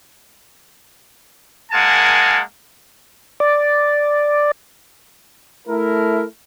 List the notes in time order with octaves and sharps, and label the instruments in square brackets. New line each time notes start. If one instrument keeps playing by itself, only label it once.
[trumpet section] G#3 A#3 A#4 F#5 G#5 A5
[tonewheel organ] D5
[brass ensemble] A3 E4 A#4